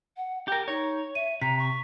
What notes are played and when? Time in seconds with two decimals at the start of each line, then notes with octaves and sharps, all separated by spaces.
0.17 F#5
0.48 G4 A#4 G5
0.68 D#4 C#5
1.15 E5 D#7
1.41 C3 A#5 B6
1.59 C#6